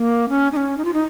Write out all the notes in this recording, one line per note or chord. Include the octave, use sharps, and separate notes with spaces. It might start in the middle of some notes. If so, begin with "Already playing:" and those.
Already playing: A#3
C#4
D#4
C#4
D#4
F4
D#4